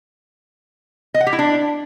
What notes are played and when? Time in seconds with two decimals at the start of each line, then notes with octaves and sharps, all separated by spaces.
1.14 D#5
1.21 F#5
1.27 G4
1.33 E4
1.39 D4